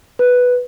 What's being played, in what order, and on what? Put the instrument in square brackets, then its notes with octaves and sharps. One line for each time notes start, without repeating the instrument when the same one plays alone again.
[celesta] B4